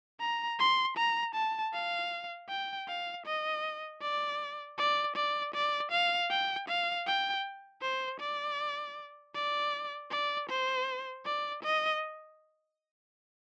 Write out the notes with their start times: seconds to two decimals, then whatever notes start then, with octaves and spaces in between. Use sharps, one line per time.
0.21 A#5
0.59 C6
0.97 A#5
1.35 A5
1.73 F5
2.49 G5
2.88 F5
3.26 D#5
4.02 D5
4.78 D5
5.16 D5
5.54 D5
5.92 F5
6.30 G5
6.68 F5
7.07 G5
7.82 C5
8.20 D5
9.35 D5
10.11 D5
10.49 C5
11.26 D5
11.63 D#5